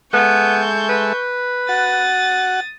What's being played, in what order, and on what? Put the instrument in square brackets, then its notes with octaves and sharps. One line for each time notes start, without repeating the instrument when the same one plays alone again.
[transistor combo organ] G#3 A4 E5 [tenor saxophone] B3 [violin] C#6 G6
[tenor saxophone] B4
[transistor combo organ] F#4 F#5 [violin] D#6 A6